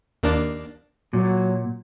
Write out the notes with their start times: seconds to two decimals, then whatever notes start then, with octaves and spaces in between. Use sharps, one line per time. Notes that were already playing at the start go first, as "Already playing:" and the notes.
0.23 D#2 A#3 D4
1.13 A#2 F#3